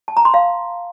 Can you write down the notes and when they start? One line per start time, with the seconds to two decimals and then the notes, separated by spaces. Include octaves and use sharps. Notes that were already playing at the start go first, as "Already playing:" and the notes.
0.08 A5
0.17 A#5
0.25 C6
0.34 F5